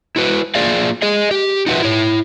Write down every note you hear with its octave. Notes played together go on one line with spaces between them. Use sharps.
E4 F#4 B4
A#3 F4 G#4 D5 F5
G#4 D#5
G4
D#4 F4 F#4 B4 E5
E4 C#5